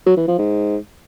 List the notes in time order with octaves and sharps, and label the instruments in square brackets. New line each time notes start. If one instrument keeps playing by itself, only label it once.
[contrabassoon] F#3
E3
F3
G#2